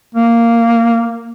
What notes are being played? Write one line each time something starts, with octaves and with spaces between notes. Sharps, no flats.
A#3